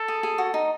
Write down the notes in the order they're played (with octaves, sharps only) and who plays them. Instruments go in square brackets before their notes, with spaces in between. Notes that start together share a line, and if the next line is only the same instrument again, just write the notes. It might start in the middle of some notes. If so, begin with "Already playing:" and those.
Already playing: [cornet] A4
[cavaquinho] G#4
G#4
F#4
D#4